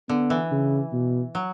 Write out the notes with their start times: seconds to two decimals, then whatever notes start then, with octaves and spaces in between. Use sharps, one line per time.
0.09 D3 B3
0.30 E3
0.51 C#3
0.93 B2
1.35 F#3